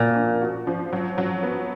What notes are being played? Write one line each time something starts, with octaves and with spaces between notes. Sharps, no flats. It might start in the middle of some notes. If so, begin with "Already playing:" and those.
Already playing: A#2 F3 A#3 F#4
D4
F#4
F3
F#3
F#3
B3